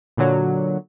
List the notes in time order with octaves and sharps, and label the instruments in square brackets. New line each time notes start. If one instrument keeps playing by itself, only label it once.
[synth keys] A#2 D3 F#3